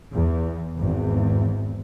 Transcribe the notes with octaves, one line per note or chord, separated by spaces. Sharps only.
E2
G#1 E2